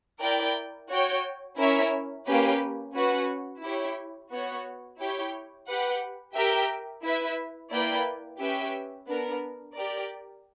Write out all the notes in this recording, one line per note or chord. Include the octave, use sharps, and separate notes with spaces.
E4 A#4 D5 G5
F#4 C#5 G5
C#4 E4 A#4 C#5 E5
A#3 C#4 G4 B4
C#4 F#4 B4 F#5
E4 G4 C#5
B3 F#4 C#5 F#5
E4 G4 C#5 G5
G4 B4 F#5
G4 A#4 E5 G5
E4 B4 E5
A#3 E4 B4 D5 G5
C#4 G4 B4 E5 G5
B3 D4 A#4
G4 A#4 D5